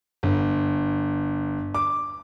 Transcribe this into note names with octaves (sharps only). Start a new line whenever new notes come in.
G1
D6